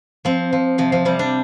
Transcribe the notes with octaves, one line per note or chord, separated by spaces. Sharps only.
F3 C4
F3
C3 F3
F3
C3 G3
D4